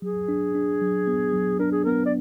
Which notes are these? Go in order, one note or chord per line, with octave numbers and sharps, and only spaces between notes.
F#3 G#4
D4
D4
F#3
B3
F#3
D4 A#4
G#4
B3 A#4
D5